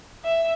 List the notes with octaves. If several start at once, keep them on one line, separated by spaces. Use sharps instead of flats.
E5